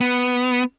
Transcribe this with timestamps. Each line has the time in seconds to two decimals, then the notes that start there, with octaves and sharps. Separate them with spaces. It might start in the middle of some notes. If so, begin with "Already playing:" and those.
0.01 B3